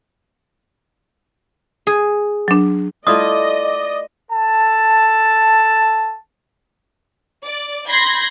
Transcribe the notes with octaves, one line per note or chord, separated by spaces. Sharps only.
G#4
F#3 D4
A3 E4 F4 D5 D#5 D#6
A4 A5
D5
B5 C6 G6 G#6 A#6 C7